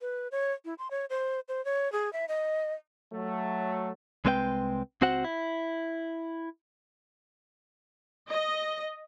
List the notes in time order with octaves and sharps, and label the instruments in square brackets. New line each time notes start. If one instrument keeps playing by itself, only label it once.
[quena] B4
C#5
E4
C6
C#5
C5
C5
C#5
G#4
E5
D#5
[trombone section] F#3 A3
[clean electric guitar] C2 G#3 C4 B4 D5 G5
C#2 C4 F#4 C5 F#5
E4
[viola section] D#5